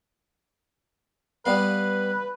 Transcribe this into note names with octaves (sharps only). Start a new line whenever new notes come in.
G3 B3 B4 F5